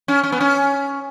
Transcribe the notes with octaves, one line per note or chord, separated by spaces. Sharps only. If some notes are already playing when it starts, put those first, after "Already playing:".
C#4
C#4
B3
C#4